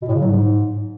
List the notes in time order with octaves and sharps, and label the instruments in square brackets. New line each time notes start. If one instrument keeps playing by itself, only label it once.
[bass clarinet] B2
A2
C#3
F#3
G#2